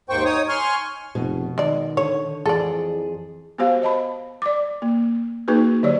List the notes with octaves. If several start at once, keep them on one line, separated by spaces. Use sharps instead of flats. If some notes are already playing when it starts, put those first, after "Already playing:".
D#2 G#2 A#3 C5 G5 C#6
D#4 C#5 D#6
G#5 C6 C#6 F6
F1 B2
D#3 G#3 D5
D3 C#5
F2 E3 G#4 A4 D5
B3 F#4 G4 C5 F5
C5 D#5 A5 B5
D5 D6
A#3
A#3 D#4 F#4 G#4 B4
D3 F#3 G4 C#5 D5